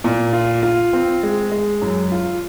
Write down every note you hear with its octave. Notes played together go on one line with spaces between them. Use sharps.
A#2
F4
F4
C4
G#3
G#3
F#2
F4